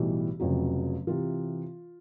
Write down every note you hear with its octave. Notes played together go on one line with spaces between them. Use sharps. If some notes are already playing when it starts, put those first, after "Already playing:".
Already playing: B1 A2 E3 G3
F1 F2 C#3 F#3
C3 E3 F4